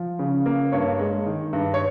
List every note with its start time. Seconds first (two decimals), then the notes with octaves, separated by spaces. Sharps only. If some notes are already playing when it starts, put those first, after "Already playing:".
Already playing: F3
0.19 C#3
0.46 A#3
0.72 G2 C#5
0.99 G#3
1.26 D#3
1.53 G2
1.74 C#5